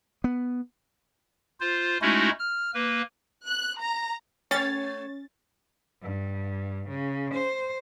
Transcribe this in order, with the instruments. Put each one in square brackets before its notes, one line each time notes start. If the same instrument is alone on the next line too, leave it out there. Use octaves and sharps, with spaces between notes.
[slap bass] B3
[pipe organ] F4 C5
G#3 A3 C#4 D#4 E4 F#4
F6
A#3 B4
[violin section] F#6
A#5
[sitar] A3 C#5 [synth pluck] C#4 A6
[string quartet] G2
C#3
C5